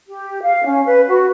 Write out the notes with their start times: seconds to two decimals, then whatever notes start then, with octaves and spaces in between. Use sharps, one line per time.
0.07 G4
0.43 F5
0.65 C#4
0.86 B4
1.08 F#4